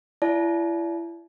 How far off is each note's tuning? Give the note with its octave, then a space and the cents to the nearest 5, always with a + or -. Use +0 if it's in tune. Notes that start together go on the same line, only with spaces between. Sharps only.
E4 +35 D5 -25 A5 -40